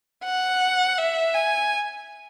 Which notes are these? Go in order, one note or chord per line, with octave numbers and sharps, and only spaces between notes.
F#5
E5
G#5